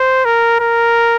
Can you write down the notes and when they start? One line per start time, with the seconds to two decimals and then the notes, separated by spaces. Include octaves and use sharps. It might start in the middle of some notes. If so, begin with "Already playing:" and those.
Already playing: C5
0.25 A#4
0.60 A#4